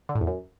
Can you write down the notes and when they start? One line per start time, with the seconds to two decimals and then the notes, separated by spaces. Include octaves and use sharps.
0.09 D3
0.15 A2
0.21 E2
0.27 F#2